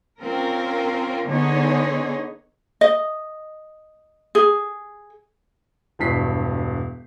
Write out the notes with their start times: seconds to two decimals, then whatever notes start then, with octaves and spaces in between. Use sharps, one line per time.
0.20 C4 C#4 F4 A#4
1.27 D3 B3 D#4 G#4 C#5 D#5
2.81 D#5
4.35 G#4
5.99 E1 G2 B6 C7